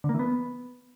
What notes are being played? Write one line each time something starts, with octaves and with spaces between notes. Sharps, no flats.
D3
A#3
E3
B3